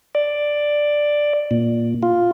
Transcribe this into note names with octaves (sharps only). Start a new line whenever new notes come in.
D5
A#2
F4